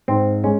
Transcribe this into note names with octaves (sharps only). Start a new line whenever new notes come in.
G#2 C4
G#3 C#4